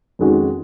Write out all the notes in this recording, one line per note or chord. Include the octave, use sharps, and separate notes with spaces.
F2 D#3 G#3 C#4 F#4